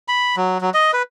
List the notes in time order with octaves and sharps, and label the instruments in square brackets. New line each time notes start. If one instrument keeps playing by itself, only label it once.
[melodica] B5
F#3
F#3
D#5
B4